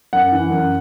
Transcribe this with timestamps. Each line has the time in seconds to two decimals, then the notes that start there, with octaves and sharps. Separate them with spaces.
0.13 F#2 F#5
0.32 E3
0.50 F#2